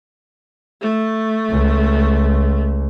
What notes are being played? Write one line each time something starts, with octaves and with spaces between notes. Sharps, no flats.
A3
C#2